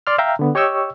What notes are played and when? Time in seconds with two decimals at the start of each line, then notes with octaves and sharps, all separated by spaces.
0.07 D5 C6 F6
0.18 E5 F5 G5 A#5
0.39 D3 B3
0.55 G4 C#5 D#5 G5 C#6 E6